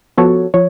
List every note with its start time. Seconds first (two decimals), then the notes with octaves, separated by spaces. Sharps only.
0.18 F3 B3 F#4 A4 C#5
0.54 F3 C#5